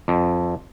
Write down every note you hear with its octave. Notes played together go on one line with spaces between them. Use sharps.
F2